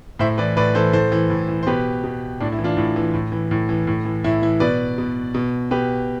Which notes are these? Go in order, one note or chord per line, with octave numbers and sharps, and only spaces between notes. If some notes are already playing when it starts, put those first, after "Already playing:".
A2 C5 E5
E3 B4 D5
A2 B4 D5
E3 A4 C5
A2 A4 C5
E3
A2
E3
C5
B2 G4 B4
B2
A2 D4
E4
E3
D4 F4
A2
E3
A2
E3
A2
E3
A2
E3
A2 E4
E3 E4
B2 B4 D5
B2
B2
B2 G4 B4